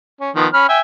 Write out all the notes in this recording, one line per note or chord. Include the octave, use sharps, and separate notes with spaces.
C#4
D#3 F3 B3
C#4 B5 F6
E5 G5 G#5